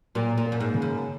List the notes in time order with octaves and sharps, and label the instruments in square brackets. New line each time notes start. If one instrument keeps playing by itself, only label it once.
[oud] A#2 [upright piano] F#3
[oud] A#2
[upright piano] A#3
[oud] F#2
G#2
[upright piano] C#3
[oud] F#2